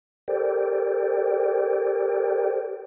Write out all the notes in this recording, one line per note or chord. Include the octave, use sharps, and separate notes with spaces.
G4 A4 A#4 C5 D5 G5